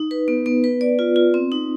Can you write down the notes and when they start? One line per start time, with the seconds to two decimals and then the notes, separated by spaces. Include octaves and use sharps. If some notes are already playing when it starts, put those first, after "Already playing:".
Already playing: D#4
0.11 B4
0.28 B3
0.46 B3
0.64 B4
0.81 D5
0.99 F4
1.16 F4
1.34 C4
1.52 D#4